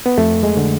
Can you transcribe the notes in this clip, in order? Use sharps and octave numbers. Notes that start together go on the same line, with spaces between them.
B3
F2 A3
G#3
D3